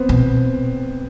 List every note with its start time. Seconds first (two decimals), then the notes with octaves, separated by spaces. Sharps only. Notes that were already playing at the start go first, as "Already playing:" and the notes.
Already playing: B3 C4
0.09 B2